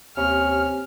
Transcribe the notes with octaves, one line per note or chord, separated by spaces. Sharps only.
D#2 C3 C#4 F6